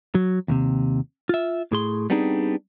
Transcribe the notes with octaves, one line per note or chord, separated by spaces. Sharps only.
F#3
D#2 A2 C3
F4 E5
A2 G#4 C6
G3 B3 C4 D4 D#4 G#4